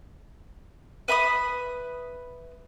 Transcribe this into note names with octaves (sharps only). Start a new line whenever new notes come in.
B4 E5 B5 D#6